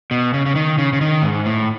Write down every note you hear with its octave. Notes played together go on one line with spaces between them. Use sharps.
B2
C#3
C#3
D#3
C#3
C#3
D#3
G#2
A2